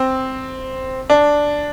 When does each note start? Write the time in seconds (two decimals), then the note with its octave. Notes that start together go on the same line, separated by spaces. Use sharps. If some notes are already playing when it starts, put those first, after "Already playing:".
Already playing: C4
1.10 D4